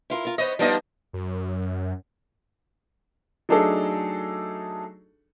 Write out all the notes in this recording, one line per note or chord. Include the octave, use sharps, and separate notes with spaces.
E4 F4 A#4
F4 A#4
B3 C5 C#5 D#5
F3 G3 B3 D4 D#4 D#5
F#2
F#3 A3 D4 D#4 G#4 A4